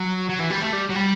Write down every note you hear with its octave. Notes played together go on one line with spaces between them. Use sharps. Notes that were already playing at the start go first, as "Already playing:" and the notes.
Already playing: F#3
F#3
E3
G3
A3
G3
F#3
G3